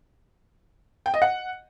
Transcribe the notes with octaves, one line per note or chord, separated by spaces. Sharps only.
G5
D#5
F#5